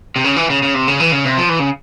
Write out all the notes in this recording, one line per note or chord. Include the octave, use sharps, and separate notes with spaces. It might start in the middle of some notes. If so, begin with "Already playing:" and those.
C3
C#3
E3
C#3
C#3
C3
C#3
E3
C#3
C3
F3
E3
C#3